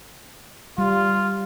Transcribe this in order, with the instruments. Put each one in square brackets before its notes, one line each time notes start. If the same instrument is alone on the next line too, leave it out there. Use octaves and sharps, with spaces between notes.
[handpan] G3 [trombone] F4